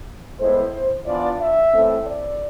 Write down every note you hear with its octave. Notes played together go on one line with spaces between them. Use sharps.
A2 G#3 B3 E4 C5
E3 B3 D4 F4 D5
E5
A2 E3 A3 C4
D5